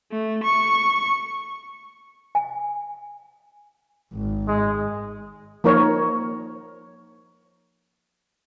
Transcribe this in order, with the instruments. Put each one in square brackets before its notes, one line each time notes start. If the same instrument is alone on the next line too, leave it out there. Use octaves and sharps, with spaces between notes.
[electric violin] A3
C#6
[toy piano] G#5
[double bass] G#1
[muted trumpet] G#3
[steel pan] F3 A#3 D#4 A#4 C5 C#5